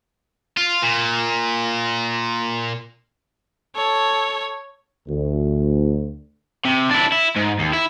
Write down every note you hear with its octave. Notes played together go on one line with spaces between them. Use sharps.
F4
A#2
A4 C#5
D2
C3
D4 E4
E4
G#2
D#2
E4